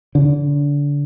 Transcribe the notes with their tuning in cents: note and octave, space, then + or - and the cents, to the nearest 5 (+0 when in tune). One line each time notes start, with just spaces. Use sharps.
D3 -30